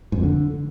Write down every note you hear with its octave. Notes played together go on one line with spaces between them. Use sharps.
G#2
F2
D3